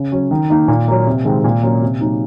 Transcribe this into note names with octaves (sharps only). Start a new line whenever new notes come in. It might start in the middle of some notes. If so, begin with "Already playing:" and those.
Already playing: C#3
F#3 C#4
D#3
A#3 D#4
A#2
F#3 A#3
C3
D#3 G#3 C4
A#2
F#3 A#3 C#4
C3
F#3 A#3 D#4